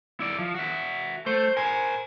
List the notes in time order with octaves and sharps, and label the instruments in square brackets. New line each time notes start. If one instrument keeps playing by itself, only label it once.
[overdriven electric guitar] E4 D5
F3
F#4 E5
[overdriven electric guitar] A3 [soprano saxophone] C5
[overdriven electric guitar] A#4 C5 [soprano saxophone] G#5